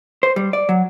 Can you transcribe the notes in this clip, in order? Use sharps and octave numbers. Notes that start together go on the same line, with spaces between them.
C5
G3
D5
F#3